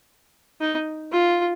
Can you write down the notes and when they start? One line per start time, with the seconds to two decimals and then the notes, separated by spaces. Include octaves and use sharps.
0.60 D#4
1.12 F4